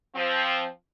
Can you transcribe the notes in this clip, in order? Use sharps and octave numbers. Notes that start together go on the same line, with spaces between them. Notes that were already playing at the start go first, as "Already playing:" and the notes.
F3 C4